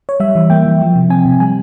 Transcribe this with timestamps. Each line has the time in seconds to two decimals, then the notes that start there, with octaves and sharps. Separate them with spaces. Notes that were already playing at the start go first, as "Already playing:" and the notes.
0.09 C#5
0.20 G3 E5
0.35 E3
0.50 A#3 G5
0.65 E3
0.81 F3
0.95 C3
1.10 C4 G#5
1.26 C3
1.40 G3 G#5